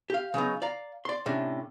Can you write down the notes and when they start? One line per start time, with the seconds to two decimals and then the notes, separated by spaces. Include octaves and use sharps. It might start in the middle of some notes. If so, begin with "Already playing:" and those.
0.10 G4 F5
0.34 C#3 F#3 B3 D#4
0.62 D5 F5 A#5
1.05 D5 C6
1.26 A2 C3 C#4 D4